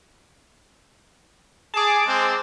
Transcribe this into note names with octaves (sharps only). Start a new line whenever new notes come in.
G#4 A5 D6
G#3 C4